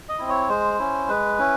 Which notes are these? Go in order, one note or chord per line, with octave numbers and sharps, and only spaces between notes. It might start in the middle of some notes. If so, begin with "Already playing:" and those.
D#5
C4 E4
C#5
G#3 C5
C#4 E4
G#3 B4
C#4 E4